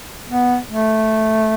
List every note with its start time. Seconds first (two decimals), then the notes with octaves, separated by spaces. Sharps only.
0.29 B3
0.69 A3